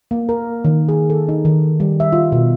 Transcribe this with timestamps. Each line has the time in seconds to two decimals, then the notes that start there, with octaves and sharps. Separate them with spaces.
0.11 A#3
0.29 A#4
0.64 D#3
0.89 G#4
1.10 A4
1.29 D#4
1.45 D#3
1.80 G3
2.00 E5
2.12 F4
2.32 B2